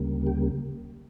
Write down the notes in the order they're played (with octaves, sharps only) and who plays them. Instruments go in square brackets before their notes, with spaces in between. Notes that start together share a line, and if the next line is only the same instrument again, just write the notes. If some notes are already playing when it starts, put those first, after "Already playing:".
Already playing: [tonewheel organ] D2 C#3 G3 A#3
G4